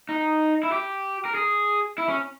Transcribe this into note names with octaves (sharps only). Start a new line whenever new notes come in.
D#4
E4
G4
A#4
G#4
E4
C#4